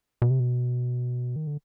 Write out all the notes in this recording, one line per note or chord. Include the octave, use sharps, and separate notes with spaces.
B2
C3
B2
D#3
D3